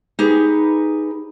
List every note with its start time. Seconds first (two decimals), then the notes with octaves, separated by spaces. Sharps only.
0.19 D#4 G4 G#4 B4